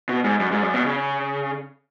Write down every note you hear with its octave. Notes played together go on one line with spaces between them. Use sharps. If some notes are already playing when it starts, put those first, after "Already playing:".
B2
G#2
F#2
G#2
F#2
B2
C#3